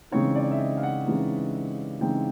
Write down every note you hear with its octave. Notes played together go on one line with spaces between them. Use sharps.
C#3 E3 G#3 C4 D#4 C#5
D5
E5
D#5
F5
F#5
C#3 E3 G#3 C4 D#4
C#3 E3 G#3 C4 D#4 G5